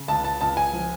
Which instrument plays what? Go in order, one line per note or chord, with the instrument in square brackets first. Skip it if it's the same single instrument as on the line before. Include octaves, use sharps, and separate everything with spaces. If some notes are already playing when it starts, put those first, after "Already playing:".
Already playing: [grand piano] C#3
C#2 A5
A5
C#2 A5
G#5
F3